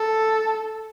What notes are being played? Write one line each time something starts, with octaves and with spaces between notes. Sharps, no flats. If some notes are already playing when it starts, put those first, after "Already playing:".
Already playing: A4